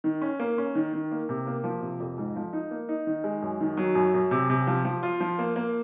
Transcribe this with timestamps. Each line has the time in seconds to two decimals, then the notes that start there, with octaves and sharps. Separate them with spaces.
0.04 D#3
0.21 C#4
0.40 A#3
0.58 C#4
0.75 D#3
0.93 D#3
1.11 A#3
1.29 C3
1.47 A#3
1.64 F3
1.82 C3
2.00 F2
2.18 G#2
2.36 F3
2.53 D#4
2.71 A#3
2.89 D#4
3.07 D#3
3.24 G#3
3.42 F#2
3.61 D#3
3.77 F#3
3.95 F#2
4.14 F#2
4.31 C3
4.50 C3
4.67 F3
4.85 F3
5.03 F4
5.20 F3
5.39 A#3
5.56 A#3